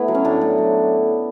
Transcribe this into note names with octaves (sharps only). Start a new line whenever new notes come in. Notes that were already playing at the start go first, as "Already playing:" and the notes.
Already playing: A3 B3 E4 B4
F#3
C#4
A2 D4
A2
F#3